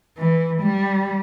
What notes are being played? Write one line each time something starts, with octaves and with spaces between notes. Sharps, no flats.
E3
G3